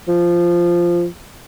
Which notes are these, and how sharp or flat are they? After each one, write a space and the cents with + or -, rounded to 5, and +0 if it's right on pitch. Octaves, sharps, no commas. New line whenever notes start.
F3 -10